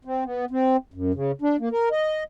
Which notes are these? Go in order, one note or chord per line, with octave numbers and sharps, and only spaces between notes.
C4
B3
C4
F#2
C#3
D4
A#3
A#4
D#5